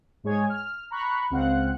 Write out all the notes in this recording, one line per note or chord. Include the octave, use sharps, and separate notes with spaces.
G#2 G#3 G#4 C#5 G#5 G#6
F6
A#5 B5 C#6 F#6
C#2 C4 F5 F#5 F#6